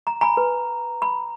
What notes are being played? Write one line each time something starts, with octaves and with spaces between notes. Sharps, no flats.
A#5
G#5 A#5 B5
B4
B5